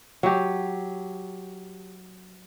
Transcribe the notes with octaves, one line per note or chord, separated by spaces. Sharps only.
F#3 G4